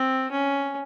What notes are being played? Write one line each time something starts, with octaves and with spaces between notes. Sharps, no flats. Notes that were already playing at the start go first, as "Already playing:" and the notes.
Already playing: C4
C#4